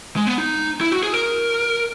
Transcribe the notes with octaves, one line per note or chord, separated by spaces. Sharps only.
G#3
B3
D#4
E4
F#4
G#4
A#4